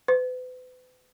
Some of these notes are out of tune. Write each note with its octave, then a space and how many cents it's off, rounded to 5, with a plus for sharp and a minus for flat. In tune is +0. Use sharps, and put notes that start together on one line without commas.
B4 +40